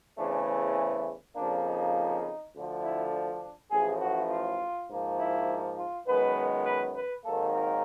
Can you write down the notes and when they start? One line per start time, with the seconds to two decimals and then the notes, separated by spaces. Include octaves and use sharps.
0.18 E2 C#3 E3 A3 C4 D4
0.48 C#4
1.36 F2 C#3 F3 A#3 D4
1.66 D#4
2.54 D2 D3 F3
2.83 E4
3.13 D4
3.71 A1 A2 F3 G#4
4.01 F#4
4.30 F4
4.89 G#2 F3 A#3
5.18 E4
5.77 F4
6.07 F#2 D#3 G#3 B3 B4
6.66 B4
6.95 B4
7.25 G#1 G#2 D#3 F#3 A#3 A4
7.54 A#4